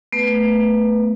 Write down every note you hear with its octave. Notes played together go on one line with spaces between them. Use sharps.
A3 B3 B4